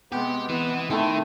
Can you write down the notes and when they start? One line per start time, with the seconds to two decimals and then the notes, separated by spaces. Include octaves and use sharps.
0.12 C3 G#3 B3 G4
0.49 E3 B3
0.90 D#3 A3 C4 E4 A4